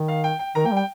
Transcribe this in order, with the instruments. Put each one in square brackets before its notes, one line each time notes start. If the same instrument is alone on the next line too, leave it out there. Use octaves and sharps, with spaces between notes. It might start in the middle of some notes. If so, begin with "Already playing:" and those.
Already playing: [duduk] D#3
[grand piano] F5
G5
G5
[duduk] D#3 [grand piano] A#4 A#5
[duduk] A#3 [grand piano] G5
[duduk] G3
[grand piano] G5